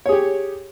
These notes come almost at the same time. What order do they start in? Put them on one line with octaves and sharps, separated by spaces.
C#5 G#4 G4